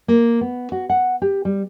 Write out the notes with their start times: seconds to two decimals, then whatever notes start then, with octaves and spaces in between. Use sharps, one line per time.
0.08 A#3
0.41 B3
0.72 F#4
0.89 F#5
1.22 G4
1.45 G3